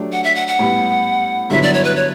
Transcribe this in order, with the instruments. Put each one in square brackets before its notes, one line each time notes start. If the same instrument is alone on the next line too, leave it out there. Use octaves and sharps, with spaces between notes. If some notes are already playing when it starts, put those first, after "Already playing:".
Already playing: [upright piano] F#3 A3 D4 G4
[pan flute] F#5
E5
F#5
F#5
[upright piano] A2 G3 B3
[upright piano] G2 D3 F#3 B3 E4 [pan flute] E5
[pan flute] D5
C#5
B4
C#5